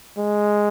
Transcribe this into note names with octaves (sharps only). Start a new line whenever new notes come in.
G#3